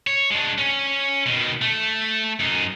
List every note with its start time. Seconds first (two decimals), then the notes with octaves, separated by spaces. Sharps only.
0.07 C#5
0.30 G#3 D4
0.58 C#4
1.26 B2 D#3
1.62 A3
2.40 F#2 D#4